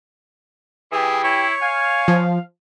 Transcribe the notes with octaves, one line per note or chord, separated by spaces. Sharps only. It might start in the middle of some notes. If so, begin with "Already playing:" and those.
E3 G4 G#4
E4 C#5
F5 G#5
F3